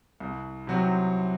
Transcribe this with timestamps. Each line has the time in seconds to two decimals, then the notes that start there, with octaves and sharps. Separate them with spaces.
0.20 C2
0.67 C3 F#3 C4 F#4